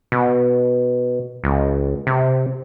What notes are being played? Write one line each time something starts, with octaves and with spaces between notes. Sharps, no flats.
B2
C#2
C3